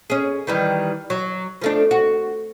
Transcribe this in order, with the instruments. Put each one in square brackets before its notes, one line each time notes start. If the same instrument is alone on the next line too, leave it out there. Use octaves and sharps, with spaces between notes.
[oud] C#4 G#4
D#3 E3 G3
F#3
F3 A3 D4
F#4